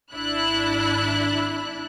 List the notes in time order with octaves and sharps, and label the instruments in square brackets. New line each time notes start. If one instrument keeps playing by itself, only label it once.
[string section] G#1 D4 E4 B5 F#6